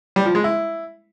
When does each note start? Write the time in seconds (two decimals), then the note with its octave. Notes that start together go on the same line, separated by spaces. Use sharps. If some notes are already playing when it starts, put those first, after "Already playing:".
0.16 G3
0.25 F3
0.35 G#3
0.44 E4